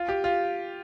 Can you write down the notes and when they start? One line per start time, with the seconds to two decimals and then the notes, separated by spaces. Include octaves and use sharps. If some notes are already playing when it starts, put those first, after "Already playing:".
Already playing: F4
0.09 G4
0.24 F4